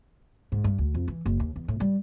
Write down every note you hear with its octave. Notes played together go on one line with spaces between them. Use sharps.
G#2
G2
D2
F2
E3
F#1
D#2
E2
A2
G3